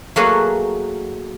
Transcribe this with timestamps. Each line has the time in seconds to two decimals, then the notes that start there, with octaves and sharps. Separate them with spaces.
0.16 F#3 A3 A#3 F#4 G#4 B4